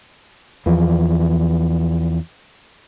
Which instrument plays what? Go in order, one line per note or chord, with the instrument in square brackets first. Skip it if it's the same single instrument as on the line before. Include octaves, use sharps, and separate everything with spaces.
[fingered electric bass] E2 E3 F3